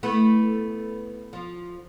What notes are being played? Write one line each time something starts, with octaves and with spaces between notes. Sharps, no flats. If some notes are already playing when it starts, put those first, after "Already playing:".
A3 B3 E4
F3